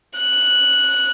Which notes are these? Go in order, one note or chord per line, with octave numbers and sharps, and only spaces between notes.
F#6